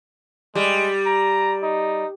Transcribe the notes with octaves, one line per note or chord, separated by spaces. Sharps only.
G3 G#3
A#5
D#4